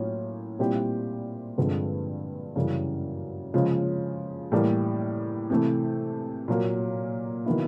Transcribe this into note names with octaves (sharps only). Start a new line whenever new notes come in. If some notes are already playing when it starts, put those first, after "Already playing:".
Already playing: A2 F#3 A#3 C#4 F4
A#2 G3 C4 E4 G4
G2 D3 F3 G#3 C4
F#2 C#3 E3 G3
C#3 F3 G#3 C#4
A2 E3 G3 A#3
C3 E3 A3
A#2 F#3 A#3
D#3 F#3 B3 E4